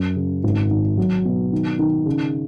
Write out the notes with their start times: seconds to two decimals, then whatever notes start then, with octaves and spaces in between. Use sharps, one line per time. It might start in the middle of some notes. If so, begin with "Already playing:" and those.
Already playing: F#2
0.16 C#3
0.43 G#1
0.70 D#3
0.97 F#3
1.25 B2
1.52 D#3
1.79 D#3
2.06 C#3